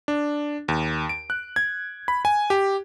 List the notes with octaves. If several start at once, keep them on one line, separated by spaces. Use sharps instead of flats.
D4
D#2
D7
F#6
G#6
B5
G#5
G4